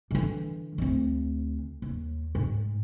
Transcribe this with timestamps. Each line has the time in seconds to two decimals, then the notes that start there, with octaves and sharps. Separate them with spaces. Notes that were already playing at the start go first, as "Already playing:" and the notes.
0.11 D3 E3
0.78 D2 C4
1.82 D#2
2.35 G#2